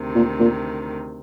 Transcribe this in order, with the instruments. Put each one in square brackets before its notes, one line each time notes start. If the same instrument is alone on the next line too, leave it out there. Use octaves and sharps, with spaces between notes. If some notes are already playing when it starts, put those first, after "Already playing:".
Already playing: [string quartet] D2 C3 D#3
[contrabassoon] A#2
A#2